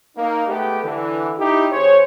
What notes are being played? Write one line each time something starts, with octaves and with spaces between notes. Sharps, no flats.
A#3 D#4
G#3 A3 B3 G4
D3 E3
D#4 E4 G4
G#1 G#4 C5 C#5